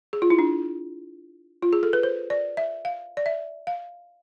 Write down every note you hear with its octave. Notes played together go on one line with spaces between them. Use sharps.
G#4
F4
E4
D4
F4
G#4
A4
B4
C5
D5
E5
F5
D5
E5
F5